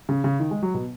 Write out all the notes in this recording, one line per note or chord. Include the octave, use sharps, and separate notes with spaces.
C#3
C#3
D#3
G#3
F#3
B2